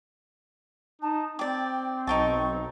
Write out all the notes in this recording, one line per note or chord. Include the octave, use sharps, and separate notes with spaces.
D#4 A5
C4 D5 G5 D6
B1 D#4 G5 A5 C#6